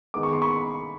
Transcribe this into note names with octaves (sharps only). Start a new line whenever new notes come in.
D#3 G#3 B3 D6
C#6
C6
B5 C#6